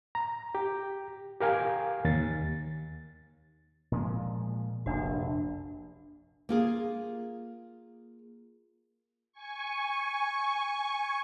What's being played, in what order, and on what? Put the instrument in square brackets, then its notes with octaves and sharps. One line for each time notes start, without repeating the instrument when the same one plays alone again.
[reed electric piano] A#5
G4
G4 A#4 F5 G#5
D#2 A6
[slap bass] A#2 F3 G#3
[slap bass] F1 A#1 F#2 [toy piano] D4 F#4
[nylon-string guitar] A#3 F4 G#4
[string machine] G#5 C#6